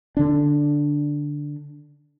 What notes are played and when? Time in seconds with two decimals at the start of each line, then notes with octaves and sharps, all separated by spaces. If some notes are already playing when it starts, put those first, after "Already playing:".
0.17 D3 D4